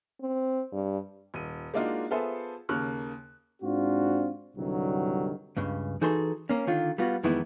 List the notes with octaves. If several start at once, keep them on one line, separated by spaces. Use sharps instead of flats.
C4
G2
D#1 D#7
G#3 A#3 D4 D#4 F4 F#4
B3 F4 G#4 A4 C5 E5
D#2 C#3 A#3 C#6 F6 F#6
G#2 C4 D4 F4 F#4
C2 G2 D3 D#3 F#3
C#2 G2 C#3
E3 D#4 F#4 G#4 A4 C6
A#3 C#4
D3 D#3 F4
G3 B3 F4 F#4
F2 D#3 E3 G#3 B3 E4